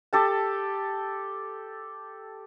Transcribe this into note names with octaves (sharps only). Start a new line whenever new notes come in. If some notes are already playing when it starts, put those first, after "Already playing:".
G4 A4 A5